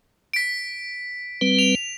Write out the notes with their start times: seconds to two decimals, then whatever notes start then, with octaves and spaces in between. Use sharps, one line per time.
0.34 B6 D7
1.41 G3 C4 B4
1.59 F7